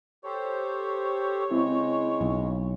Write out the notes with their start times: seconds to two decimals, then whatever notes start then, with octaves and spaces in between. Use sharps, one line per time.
0.24 G4 A4 C5 C#5
1.51 C#3 G#3 C4 E4
2.21 B1